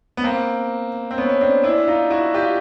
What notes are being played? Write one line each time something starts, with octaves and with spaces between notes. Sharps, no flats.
B3
A#3 C4
C4
B3 C#4
C#4
C4 D4
D4 E4
D#4 F4
E4 F#4
F4 G4